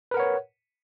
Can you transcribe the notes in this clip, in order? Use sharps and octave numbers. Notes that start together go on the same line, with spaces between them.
A#4 B4 C#5 F#5